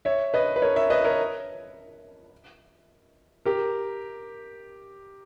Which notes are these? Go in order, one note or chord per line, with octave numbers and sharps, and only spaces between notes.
C#5 E5
B4 D#5
B4
A#4 C#5
C#5 E5
B4 D#5
A#4 C#5
G4 A#4